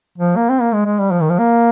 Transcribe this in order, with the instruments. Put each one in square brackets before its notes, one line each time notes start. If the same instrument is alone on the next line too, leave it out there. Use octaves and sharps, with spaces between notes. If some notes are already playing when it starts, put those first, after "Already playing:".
[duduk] F3
A#3
C4
A#3
G#3
G#3
G3
F3
D#3
F3
A#3